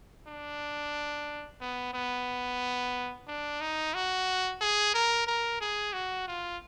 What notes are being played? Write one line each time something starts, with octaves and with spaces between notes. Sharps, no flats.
D4
B3
B3
D4
D#4
F#4
G#4
A#4
A#4
G#4
F#4
F4